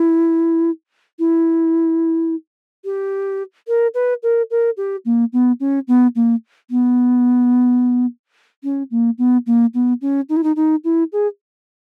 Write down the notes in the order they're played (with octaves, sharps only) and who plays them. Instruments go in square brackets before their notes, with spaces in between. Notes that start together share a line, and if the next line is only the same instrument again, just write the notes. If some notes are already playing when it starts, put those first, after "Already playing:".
Already playing: [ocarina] E4
E4
G4
A#4
B4
A#4
A#4
G4
A#3
B3
C#4
B3
A#3
B3
C#4
A#3
B3
A#3
B3
C#4
D#4
E4
D#4
D#4
E4
G#4